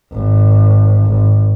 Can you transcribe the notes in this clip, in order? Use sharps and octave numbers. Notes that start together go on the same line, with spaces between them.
G#1
G#1